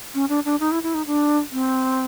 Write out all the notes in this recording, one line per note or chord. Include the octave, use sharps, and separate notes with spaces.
C#4
D4
D4
D#4
E4
E4
D#4
D4
C4